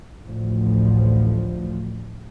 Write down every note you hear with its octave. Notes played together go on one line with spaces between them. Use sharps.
A1 D2 F3